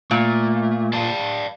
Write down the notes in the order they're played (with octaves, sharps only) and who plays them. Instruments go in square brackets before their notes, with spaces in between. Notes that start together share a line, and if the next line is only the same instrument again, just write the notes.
[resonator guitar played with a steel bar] A#2 [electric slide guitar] A3
[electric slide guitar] D5 F5 A5